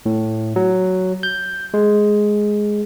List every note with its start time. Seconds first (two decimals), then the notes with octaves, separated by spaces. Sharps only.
0.06 A2
0.56 F#3
1.23 G6
1.74 G#3